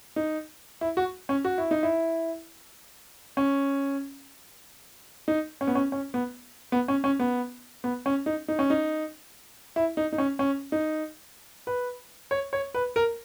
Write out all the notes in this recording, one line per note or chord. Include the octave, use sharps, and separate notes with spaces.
D#4
E4
F#4
C#4
F#4
E4
D#4
E4
C#4
D#4
C#4
B3
C#4
C#4
B3
B3
C#4
C#4
B3
B3
C#4
D#4
D#4
C#4
D#4
E4
D#4
D#4
C#4
C#4
D#4
B4
C#5
C#5
B4
A#4